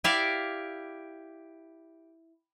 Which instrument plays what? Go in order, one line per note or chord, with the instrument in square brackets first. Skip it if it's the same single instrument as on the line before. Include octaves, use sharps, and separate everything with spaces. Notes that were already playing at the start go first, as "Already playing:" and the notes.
[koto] E4 G4 D5 E5 F5